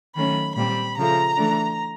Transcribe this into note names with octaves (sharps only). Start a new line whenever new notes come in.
D#3 F#3 A3 C#4 B5
A#2 G3 C4 B5
C#3 F3 A3 A#5
E3 A3 D4